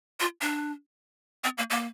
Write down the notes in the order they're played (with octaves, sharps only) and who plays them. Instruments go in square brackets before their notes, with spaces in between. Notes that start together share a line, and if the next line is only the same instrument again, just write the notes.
[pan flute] F4
D4
C4
A#3
A#3